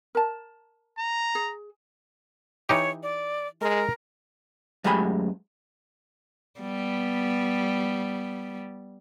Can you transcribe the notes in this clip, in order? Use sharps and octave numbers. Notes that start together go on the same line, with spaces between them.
A#4 A5
A#5
G#4
E3 D#4 G4 C#5
D5
G#3 A#4
F#2 G#3 A3 G4 G#5 B5
G3 B3